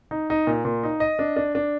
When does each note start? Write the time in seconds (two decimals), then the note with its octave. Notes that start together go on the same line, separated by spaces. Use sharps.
0.11 D#4
0.30 D#4
0.47 A#2
0.65 A#2
0.83 D#4
1.00 D#5
1.19 D4
1.36 D4
1.55 D4